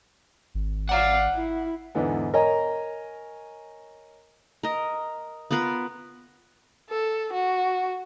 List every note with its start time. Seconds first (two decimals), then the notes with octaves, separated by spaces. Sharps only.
0.55 G#1
0.89 D5 F5 F#5 A#5
1.34 E4
1.95 E2 G#2 D3 E3 B3
2.34 A#4 C#5 D#5 G#5 A#5
4.63 A#4 D#5
5.51 B3 F4 A#4 B4
6.89 A4
7.33 F#4